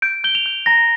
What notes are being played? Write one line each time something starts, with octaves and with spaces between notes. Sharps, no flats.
G6 D7
G6 G7
F7
G6
A#5 A#6